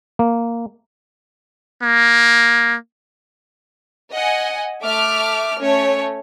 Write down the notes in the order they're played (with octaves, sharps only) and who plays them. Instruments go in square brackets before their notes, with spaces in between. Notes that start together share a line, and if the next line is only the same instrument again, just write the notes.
[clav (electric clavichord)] A#3
[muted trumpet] A#3
[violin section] D#5 F#5 G#5
A3 E5 D6 F6
A3 C#4 C#5